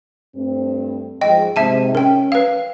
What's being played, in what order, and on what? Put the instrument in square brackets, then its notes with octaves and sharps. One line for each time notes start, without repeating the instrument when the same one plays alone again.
[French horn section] G2 A3 C4
[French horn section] G#2 F3 G#4 [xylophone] D#5 G5
[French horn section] G#2 C3 [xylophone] E5 A5 D#7
[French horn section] C#4 [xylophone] A#4 G5
[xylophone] B4 F5